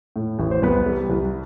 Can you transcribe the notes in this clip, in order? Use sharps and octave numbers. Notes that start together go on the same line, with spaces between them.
A2
A1
C5
C2 B3 B4
G3
C2